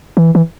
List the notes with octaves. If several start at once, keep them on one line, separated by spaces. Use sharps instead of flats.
E3
E3